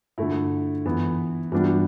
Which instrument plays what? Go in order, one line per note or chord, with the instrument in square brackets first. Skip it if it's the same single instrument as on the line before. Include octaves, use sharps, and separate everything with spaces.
[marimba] G2 [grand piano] D3 A3 E4
[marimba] F#2 [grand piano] E3 B3 E4
[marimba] G2 [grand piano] E3 G3 B3 D4 F#4